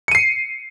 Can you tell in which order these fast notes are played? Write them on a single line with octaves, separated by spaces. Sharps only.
C#7 D#7 C7